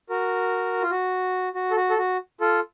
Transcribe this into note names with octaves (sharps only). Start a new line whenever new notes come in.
F#4 A#4
F4
F#4
F#4
A4
F#4
A4
F#4
F4 A4